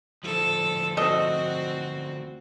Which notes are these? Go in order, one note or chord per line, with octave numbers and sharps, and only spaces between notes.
D2 F3 A4
C4 F#4 A4 D#5